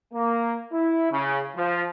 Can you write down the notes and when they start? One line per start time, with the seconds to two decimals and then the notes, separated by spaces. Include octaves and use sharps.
0.13 A#3
0.72 E4
1.11 C#3
1.56 F3